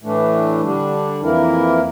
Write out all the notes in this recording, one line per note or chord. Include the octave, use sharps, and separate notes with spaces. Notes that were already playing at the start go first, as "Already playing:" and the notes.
A2 E3 A3 D4
D3 G3 D4
F2 E3 A#3 E4 A#4